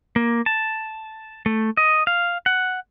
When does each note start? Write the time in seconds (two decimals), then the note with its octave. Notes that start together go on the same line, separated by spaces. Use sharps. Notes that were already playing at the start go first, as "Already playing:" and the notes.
0.16 A#3
0.46 A5
1.46 A3
1.77 D#5
2.07 F5
2.46 F#5